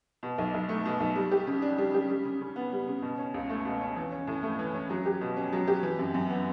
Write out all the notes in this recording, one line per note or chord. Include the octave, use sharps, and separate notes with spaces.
B2
B1
B1
A3
B2
B1
G3
G4
C#3
D4
G3
G4
G3
C#3
C#3
B3
G3
C#3
B2
C#4
C#2
A3
B2
C#4
E3
C#4
A2
A3
E3
C#4
F#3
G4
B2
C#4
F#3
G4
E3
F#2
F#2
B3